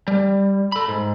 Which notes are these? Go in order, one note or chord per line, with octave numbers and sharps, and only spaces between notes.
G3
A4 B5
G#2